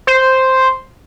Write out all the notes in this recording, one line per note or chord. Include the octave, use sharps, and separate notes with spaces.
C5